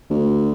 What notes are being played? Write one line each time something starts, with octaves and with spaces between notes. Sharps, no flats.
D2